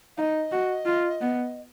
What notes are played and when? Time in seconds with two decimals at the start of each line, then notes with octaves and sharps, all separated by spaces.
0.17 D#4 D#5 F5
0.52 F#4
0.86 F4
1.21 B3